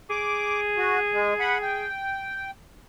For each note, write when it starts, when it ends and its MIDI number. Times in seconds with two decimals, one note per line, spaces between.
0.10 1.86 68
0.10 0.61 86
0.78 1.00 66
1.14 1.34 56
1.40 1.58 78
1.40 1.58 83
1.62 2.51 79